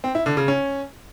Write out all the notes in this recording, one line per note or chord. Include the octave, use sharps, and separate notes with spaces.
C4
E4
D3
C#3
C#4